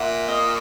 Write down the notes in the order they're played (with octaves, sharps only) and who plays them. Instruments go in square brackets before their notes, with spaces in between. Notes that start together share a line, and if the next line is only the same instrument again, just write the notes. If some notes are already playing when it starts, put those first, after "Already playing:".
Already playing: [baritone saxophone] A#2 [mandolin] E5 F#5
[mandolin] D#5 F5